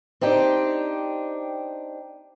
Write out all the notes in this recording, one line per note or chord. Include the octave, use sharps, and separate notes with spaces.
C4 D4 D#4 G4